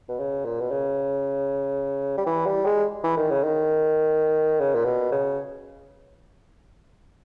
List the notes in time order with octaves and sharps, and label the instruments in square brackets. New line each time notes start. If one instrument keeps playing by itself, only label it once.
[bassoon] B2
C#3
A#2
B2
C#3
G3
E3
G3
G#3
E3
D#3
C#3
D#3
C#3
A#2
B2
C#3